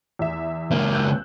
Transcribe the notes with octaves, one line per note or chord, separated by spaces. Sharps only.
E2 E5
C#2 A#3
E6 F#6 G6